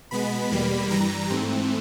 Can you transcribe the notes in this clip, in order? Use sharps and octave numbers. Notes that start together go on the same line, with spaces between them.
B2 G#3 B3 B5
E2 B2 G3 A#3
G2 E3 G3 A#5
G#2 E3 A3 C4